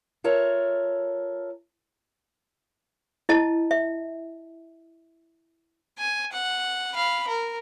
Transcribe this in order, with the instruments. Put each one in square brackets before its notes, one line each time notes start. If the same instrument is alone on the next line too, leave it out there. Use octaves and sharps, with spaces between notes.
[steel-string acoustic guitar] F4 A4 A#4 C#5 E5
[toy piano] E4 D#5 A5
E5
[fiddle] G#5
F#5
F5 B5
A#4